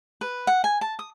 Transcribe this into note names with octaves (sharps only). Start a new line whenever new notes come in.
B4
F#5
G#5
A5
D#6